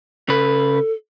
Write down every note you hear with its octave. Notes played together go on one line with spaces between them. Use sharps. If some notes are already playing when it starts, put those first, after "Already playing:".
C#3 A4 B4